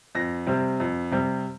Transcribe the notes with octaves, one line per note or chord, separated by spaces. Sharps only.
F2 A#6
C3 G3 C4
F2
C3 G3 C4